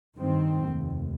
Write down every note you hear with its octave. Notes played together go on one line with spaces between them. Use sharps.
G2 D#3 C4
F1 D#2